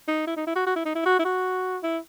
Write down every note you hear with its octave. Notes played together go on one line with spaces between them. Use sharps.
D#4
E4
D#4
E4
F#4
F#4
E4
D#4
E4
F#4
E4
F#4
E4